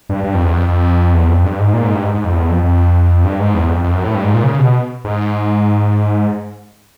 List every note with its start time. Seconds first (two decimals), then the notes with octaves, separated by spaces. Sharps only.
0.09 G2
0.24 G2
0.34 F2
0.44 E2
0.54 F2
0.68 F2
1.14 E2
1.29 F2
1.44 G2
1.59 G#2
1.74 A#2
1.84 G#2
1.94 G2
2.04 G#2
2.14 G#2
2.24 F2
2.34 E2
2.49 F2
2.64 F2
3.25 G2
3.39 G#2
3.54 E2
3.69 F2
3.84 F2
3.94 F#2
4.04 A2
4.15 G2
4.24 G#2
4.34 A#2
4.44 C#3
4.59 B2
5.04 G#2